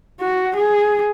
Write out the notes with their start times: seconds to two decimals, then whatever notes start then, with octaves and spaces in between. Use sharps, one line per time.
0.21 F#4
0.56 G#4